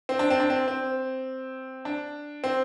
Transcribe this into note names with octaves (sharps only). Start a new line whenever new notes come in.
C4
D4
C4
D4
C4
C4
D4
C4